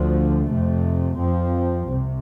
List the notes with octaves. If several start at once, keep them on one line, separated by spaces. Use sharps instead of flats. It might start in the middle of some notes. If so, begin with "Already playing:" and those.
Already playing: D2 D3 F3
F2 C3 A3
F2 F3 C4
C2 C3